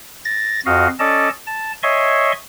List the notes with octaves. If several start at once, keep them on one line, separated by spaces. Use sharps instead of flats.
A6 A#6
F2 F#4 D#5 F5
C#4 A4 D5 D#5 A5
A5
C#5 D#5 E5 G#5 C6 C#6